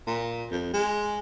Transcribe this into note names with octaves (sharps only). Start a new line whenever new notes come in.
A#2
F2
G#3